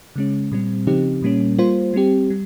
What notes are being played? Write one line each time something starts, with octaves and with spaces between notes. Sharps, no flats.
C#3 G#3 C#4
A#2 G3 C4
C#3 F3 C4 D#4 G4
A#2 G3 A#3 C#4
G3 A#3 F4 C5
G3 C4 G4
G3